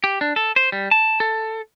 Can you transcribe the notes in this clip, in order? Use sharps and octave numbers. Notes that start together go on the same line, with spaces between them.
G4
D4
A4
C5
G3
A5
A4